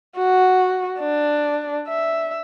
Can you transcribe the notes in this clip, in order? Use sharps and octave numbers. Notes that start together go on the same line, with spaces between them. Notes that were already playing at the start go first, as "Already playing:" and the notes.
F#4
D4
E5